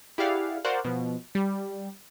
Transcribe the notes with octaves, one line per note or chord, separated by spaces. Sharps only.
E4 G4 G#4 D5 F5 F#5
F#4 A#4 C5 D5 F5 F#5
B2 F3
G3